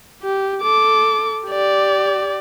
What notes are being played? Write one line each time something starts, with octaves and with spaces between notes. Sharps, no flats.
G4
A4 D6
G4 D5